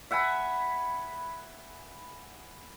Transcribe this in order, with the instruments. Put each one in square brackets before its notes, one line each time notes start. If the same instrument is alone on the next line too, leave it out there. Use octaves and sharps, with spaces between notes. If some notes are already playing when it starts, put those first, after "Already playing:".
[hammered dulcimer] E5 F#5 G#5 B5